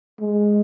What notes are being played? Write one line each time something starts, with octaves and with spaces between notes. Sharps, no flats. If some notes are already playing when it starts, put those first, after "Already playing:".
G#3